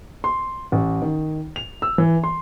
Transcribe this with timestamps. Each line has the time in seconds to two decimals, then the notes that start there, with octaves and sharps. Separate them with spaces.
0.24 C6
0.72 A1
1.02 D#3
1.56 F7
1.82 E6
1.98 E3
2.24 C6